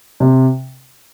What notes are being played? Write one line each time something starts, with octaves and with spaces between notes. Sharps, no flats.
C3